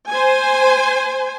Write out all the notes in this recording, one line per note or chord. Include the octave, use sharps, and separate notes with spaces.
C5 G#5